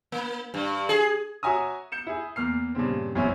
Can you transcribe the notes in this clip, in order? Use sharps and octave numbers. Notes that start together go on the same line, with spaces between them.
A#3
G2
G#4
F#4 C#5 E5 G#5 A#5 D#6
G6 C#7 E7
E4 G#4
E2 A#3 F6 C7
G2 A#2 C#3 C4
A1 F#2 A#2 C4 C#4 E4